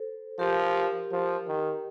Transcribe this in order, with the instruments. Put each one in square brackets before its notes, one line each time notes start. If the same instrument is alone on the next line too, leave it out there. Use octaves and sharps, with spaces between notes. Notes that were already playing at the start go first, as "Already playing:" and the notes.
Already playing: [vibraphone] A4 C5
[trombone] F3 [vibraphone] G4 A#4
[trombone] F3
D#3